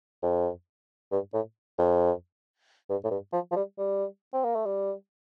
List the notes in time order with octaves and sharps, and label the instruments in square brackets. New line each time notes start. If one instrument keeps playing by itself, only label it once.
[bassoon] F2
G2
A2
F2
G2
A2
G2
F3
F3
G3
G3
C4
A#3
A3
G3